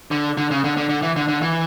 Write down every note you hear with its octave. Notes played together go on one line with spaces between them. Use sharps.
D3
D3
C#3
D3
D3
D3
E3
D3
D3
E3